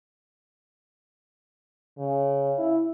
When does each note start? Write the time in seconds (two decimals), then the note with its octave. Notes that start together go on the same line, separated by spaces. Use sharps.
1.98 C#3
2.58 E4